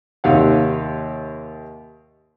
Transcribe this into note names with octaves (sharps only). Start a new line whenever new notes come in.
D#2 C3 F5 F#5